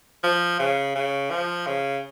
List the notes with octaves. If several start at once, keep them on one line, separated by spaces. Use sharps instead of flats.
F3
C#3
C#3
F3
C#3